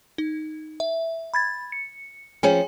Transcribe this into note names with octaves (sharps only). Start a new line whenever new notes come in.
D#4
E5
B5 G#6 A6
C#7
F3 C#4 G#4 G5 G#5